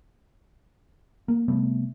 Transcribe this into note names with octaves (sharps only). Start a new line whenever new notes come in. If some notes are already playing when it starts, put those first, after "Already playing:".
A#3
C3 G3 A3 B3